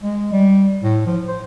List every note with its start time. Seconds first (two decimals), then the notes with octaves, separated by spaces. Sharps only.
0.03 G#3
0.33 G3
0.83 A2
1.06 F3
1.28 C5